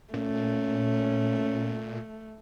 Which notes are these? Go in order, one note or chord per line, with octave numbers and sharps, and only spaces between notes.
A#2 A3 C#4